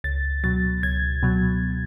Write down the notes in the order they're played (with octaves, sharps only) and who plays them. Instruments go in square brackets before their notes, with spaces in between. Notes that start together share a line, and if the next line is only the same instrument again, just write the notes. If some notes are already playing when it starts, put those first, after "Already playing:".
[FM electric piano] C#2 A6
B2 F#3 A6
C#2 G#6
B2 F#3